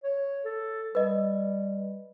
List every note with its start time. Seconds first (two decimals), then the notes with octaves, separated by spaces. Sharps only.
0.04 C#5
0.45 A4
0.95 G3 B4 D#5